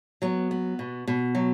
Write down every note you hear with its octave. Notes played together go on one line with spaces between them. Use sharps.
F#3 B3
B3
B2
B2
F#3